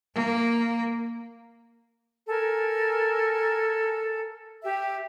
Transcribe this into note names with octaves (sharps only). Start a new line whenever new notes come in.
A#3
A4 A#4 G#5
G4 E5